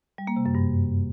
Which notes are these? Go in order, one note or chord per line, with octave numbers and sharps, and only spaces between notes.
G3
A#3
C3
F#2
G2